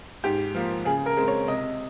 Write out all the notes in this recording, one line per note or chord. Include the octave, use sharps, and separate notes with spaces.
G#2 G4
F3 A#3
C#3 G#4
A#4
G#3 C4
C#5
C3 D#5